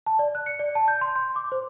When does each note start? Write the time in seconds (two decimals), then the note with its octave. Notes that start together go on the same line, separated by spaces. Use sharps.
0.07 A5
0.19 D5
0.35 F#6
0.46 C#7
0.60 D5
0.75 A5
0.88 G6
1.01 C6
1.16 C6
1.36 D6
1.52 C5